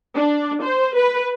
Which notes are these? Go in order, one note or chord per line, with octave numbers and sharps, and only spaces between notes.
D4
C5
B4